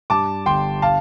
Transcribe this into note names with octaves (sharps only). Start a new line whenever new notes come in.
G2 A5 D6
G1 G5 C6
F5 A5